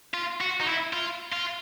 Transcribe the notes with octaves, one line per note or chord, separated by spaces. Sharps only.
F4
F#4
D#4
E4
F4
F4